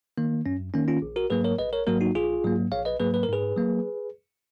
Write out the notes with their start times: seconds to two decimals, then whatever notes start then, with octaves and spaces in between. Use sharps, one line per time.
0.18 D#3 A#3
0.46 F#2 C#4
0.74 D#3 A#3 C#4
0.88 C#4 F4
1.02 A#1
1.16 F#4 A#4
1.30 G#2 F#3 A#3 G#4 B4
1.44 A#4 C#5
1.59 A#1 B4 D#5
1.73 A#4 C#5
1.87 G#2 F#3 A#3 F#4 A#4
2.01 D#4 F#4
2.15 A#1 F4 G#4
2.44 G#2 F#3 A#3
2.71 A#1 C#5 F5
2.85 B4 D#5
3.00 G#2 F#3 A#3 G#4 B4
3.14 B4
3.23 A#4
3.29 G#2 G#4 B4
3.57 F#3 A#3